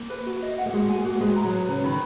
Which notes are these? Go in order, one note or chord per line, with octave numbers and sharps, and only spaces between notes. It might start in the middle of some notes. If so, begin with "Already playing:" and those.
Already playing: A#3
B4
F#4
D#5
F#5
A#3
G#3 F#4
G#5
A#3
F#4
A#3
G#3 B4
A#5
F#3
B4
C#3 B4
D#3 B5